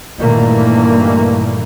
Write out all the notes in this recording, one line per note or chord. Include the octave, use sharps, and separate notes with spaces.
G2 A#2 D#3 E3 A3 A#3